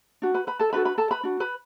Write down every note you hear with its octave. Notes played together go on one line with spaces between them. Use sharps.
D4 F#4
B4 B5
B4 B5
A4 A5
D4 F#4 A4 B4 B5
B4 B5
A4 A5
B4 B5
D4 F#4
B4 B5